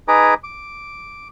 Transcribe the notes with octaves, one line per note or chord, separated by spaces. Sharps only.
D#4 G#4 B4 G#5 A#5 D6
D6